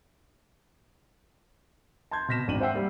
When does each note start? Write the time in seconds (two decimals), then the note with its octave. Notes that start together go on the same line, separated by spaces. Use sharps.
2.11 A5 C6 G6 G#6
2.28 B2 F6 A#6 B6 E7
2.48 G#1 D4 D#7 F#7
2.61 C5 E5 F#5 G5 E6 C7
2.73 G3 A#3